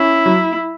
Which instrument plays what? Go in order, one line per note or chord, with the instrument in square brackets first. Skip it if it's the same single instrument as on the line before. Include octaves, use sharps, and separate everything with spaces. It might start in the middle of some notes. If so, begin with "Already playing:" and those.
Already playing: [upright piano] C#4 [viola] E4
[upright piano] F#3